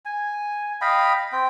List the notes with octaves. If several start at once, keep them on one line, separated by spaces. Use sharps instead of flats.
G#5
D#5 F5 G5 B5
C4 G5